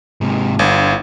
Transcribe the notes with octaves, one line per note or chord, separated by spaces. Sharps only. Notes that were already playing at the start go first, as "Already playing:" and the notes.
G#2 C3
G1 E4 F5